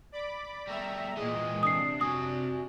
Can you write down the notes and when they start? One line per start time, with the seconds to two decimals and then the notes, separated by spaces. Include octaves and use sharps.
0.12 D5 B5 D6
0.67 G3 A3 E5 A#5
1.17 A#2 E3 G#3 D#5
1.63 C3 D4 D#6 C7
2.01 F#4 G#5 D#6